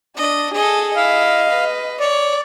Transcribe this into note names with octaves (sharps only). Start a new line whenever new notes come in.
D4 D#5
G#4 A4 D#5
E4 D#5 F5
B4
C#5 D5